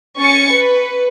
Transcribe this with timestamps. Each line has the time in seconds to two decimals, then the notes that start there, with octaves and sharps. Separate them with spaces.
0.20 C#4 C#6 A6 C#7
0.53 B4